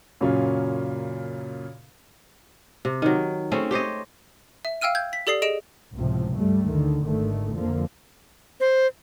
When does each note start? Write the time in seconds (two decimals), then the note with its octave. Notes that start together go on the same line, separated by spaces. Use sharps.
0.21 F#2 A#2 C#3 F#3 C#4 F4
2.85 C3
3.02 D#3 F#3
3.52 A3 C4 C#4 G#4
3.71 G4 C5 C#5 D#5
4.65 E5
4.81 F5 G5 E6 F6 D#7
4.95 G6 G#6
5.13 B6
5.27 G4 A4 D5 D#6 C7
5.42 G#4 D#5 D7 E7
5.94 C#2 A2 C3 F3
6.34 G2 G3 A3
6.67 D2 D3 D#3
7.04 G#1 D3 D#3 A3
7.54 F2 D3 F3 A#3
8.60 C5